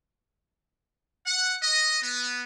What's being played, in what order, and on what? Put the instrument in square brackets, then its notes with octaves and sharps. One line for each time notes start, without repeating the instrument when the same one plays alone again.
[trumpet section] F#5
D#5
B3